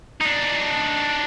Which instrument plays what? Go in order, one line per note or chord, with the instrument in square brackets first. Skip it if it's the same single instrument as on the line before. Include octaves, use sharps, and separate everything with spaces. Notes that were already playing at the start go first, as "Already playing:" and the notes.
[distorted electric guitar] D4 D#4